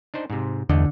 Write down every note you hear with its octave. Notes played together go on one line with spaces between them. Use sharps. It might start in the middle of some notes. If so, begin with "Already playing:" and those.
D4 D#4 C5
G#2 C3
G1 E2 D3 A3 D#5